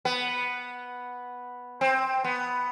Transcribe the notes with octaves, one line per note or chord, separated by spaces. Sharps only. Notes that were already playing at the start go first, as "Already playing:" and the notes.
B3
C4
B3